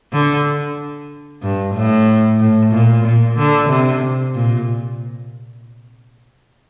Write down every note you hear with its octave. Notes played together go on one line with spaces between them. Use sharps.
D3
G2
A2
A2
A#2
A#2
D3
C3
A#2